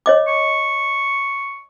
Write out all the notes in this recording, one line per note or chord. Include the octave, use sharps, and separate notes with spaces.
C#5 D#5 D6
C#6